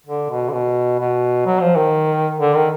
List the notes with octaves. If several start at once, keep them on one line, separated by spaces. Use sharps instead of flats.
D3
B2
D3
B2
B2
F#3
F3
D#3
D3
D#3